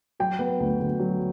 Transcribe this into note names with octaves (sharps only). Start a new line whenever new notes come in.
F#3 G5
B3
D2
D2
F#3